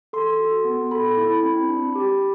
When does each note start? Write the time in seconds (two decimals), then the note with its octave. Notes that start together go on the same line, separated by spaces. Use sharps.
0.13 A4 C6
0.39 F#4
0.65 B3
0.91 A4 B5
1.17 E4
1.43 C4
1.69 D4
1.95 G4